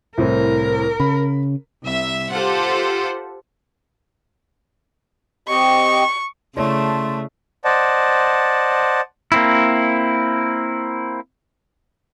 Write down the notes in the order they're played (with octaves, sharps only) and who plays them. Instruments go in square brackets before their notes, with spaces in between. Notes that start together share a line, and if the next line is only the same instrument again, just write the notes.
[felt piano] C2 A2 C4 [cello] A#4
[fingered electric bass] C#3 [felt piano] B5
[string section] C2 E5
F4 G4 A4 C5 F#5
[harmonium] C4 G4 D#5 [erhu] C#6
[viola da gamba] C#3 [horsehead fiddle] A3 [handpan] E4 C#5 D5 [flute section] A5 C6
[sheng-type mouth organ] C5 D5 D#5 F#5 A5
[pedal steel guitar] A#3 C4 E4